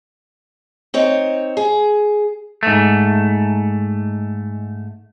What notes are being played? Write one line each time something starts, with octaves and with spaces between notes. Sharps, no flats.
C4 D#4 C#5
G#4
G#2 A3